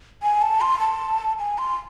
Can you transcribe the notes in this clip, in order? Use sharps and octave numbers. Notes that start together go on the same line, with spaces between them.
G#5
A5
C6
A5
G#5
C6